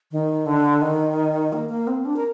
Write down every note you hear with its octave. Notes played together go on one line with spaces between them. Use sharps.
D#3
D3
D#3
A#3
A#3
C4
D4
A#4